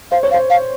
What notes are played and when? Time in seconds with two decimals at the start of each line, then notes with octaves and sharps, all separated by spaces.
0.11 C5 F5
0.23 C#5
0.31 F5
0.34 C5
0.50 F5